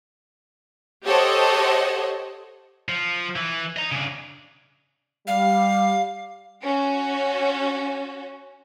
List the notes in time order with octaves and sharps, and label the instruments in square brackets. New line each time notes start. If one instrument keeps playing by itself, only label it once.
[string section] G4 A4 C5 C#5 D#5 F#5
[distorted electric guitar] F3
E3
D#5 A#5
C#3 D4
[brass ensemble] G3 [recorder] F5
[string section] C#4 F#4